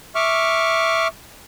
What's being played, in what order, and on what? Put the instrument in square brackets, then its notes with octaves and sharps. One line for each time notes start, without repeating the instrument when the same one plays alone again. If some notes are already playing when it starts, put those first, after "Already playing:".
[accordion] E5 C#6 D6 F6